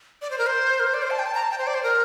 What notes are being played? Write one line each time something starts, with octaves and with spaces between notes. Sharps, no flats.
D5
C5
A#4
C5
A#4
C5
D5
C5
A5
G5
A5
A#5
A5
G5
C5
D5
C5
A#4